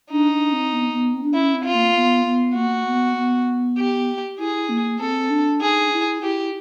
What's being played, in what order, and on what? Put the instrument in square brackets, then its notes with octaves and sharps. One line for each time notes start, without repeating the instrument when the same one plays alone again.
[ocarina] D4 [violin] D#4
[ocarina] D4
C4
B3
B3
C4
D4
[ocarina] C#4 [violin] E4
[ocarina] C4
[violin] F4
[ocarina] A#3
B3
B3
[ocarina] A#3 [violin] F#4
[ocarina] B3
B3
[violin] G4
[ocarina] E4 [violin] G#4
[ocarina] A#3
[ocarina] C4 [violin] A4
[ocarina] D4
[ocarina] D#4 [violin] G#4
[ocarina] E4
[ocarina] E4 [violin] G4